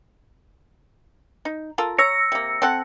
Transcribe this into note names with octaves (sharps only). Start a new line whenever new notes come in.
D#4
F4 A4 A#4
C#5 A#5 E6 A#6 C#7
C3 A#3
C4 A4 F#5